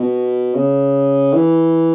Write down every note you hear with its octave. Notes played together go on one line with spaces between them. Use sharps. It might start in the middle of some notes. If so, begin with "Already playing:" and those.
Already playing: B2
C#3
E3